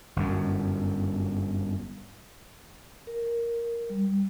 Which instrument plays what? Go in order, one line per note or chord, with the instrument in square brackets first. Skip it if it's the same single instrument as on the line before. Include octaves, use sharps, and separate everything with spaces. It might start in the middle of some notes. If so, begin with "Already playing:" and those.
[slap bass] G1 F#2
[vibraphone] A#4
G3